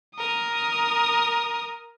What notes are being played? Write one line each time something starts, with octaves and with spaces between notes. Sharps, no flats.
A#4 D#6